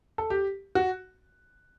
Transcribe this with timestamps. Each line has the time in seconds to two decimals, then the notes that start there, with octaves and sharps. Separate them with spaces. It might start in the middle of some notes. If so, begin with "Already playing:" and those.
0.18 A4
0.30 G4
0.75 F#4